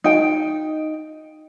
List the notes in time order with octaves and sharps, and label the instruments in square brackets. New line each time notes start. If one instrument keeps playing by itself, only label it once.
[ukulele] D#4 G5